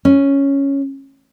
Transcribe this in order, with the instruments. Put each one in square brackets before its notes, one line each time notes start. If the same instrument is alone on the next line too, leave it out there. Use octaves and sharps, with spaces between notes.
[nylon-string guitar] C#4